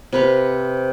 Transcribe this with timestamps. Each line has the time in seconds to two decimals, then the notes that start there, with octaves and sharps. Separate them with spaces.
0.13 C3 B4 F5